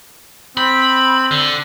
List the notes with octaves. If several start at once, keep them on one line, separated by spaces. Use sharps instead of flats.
C4 B5
D3